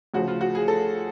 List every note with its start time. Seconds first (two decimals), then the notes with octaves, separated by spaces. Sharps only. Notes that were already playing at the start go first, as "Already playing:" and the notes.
0.14 D2 C#3 F3 F#4
0.28 F4
0.41 F#4
0.55 G#4
0.68 A4